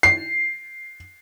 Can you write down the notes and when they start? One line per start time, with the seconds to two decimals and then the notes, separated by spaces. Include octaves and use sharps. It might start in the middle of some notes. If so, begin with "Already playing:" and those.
0.03 C7